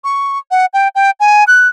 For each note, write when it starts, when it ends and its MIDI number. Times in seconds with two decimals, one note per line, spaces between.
0.04 0.38 85
0.51 0.66 78
0.73 0.88 79
0.95 1.11 79
1.20 1.44 80
1.47 1.68 90